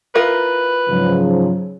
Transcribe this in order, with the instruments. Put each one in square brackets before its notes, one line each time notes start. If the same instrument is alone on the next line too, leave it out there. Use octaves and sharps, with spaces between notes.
[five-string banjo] E4 F4 A#4 [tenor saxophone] B4
[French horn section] G#2 C#3 F3 [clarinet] F#3